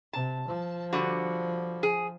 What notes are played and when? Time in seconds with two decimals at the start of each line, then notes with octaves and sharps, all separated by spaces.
0.13 C3 A5
0.48 F3
0.93 D3 G3 F#4
1.83 G#4